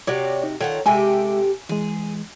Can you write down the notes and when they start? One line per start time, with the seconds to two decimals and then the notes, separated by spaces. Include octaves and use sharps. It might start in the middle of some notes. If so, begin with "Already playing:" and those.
0.07 C3 F#4 C#5 D5
0.43 D#4
0.60 D#3 F4 A4 C#5 F#5
0.86 C3 G#3 G4 A4 E5 G#5
1.69 E3 G#3 G#4